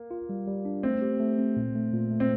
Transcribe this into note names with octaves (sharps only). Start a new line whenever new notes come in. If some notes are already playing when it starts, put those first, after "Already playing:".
Already playing: A#3
F4
G3
G3
D4
A3 C4
G4
A3
C4
A#2
A3
A#2
A3
C4